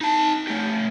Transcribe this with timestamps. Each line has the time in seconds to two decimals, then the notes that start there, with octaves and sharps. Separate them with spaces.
0.01 D#4 A5
0.47 A3 G4